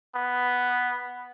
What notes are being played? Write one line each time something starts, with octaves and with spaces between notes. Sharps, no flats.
B3